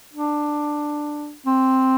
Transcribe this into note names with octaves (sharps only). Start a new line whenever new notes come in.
D4
C4